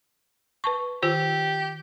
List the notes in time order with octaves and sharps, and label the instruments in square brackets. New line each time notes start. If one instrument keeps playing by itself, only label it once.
[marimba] B4 A5 C#6
[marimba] D#3 F4 C5 [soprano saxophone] G4